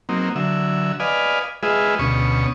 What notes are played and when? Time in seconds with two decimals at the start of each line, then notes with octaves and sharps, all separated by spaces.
0.09 F#3 A#3 C4 D#4
0.36 D3 F#3 E5
1.00 B4 D5 D#5 F5 G#5
1.63 G#3 F4 G#4 B4 D#5 E5
1.99 D2 B2 C#4 C#6 D#6